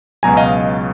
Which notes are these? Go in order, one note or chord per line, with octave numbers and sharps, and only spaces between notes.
C#2 B2 F#3 G#5 A#5
D#5 F5